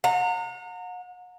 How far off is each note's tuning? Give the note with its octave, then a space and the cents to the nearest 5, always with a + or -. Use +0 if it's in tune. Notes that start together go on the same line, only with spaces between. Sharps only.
F#5 -40 A#5 -30